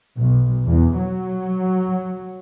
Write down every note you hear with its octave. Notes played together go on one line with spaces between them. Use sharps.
B1
E2
F#3